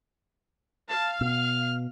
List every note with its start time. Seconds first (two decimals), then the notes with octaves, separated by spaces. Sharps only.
0.89 F5 A5
1.21 B2 F6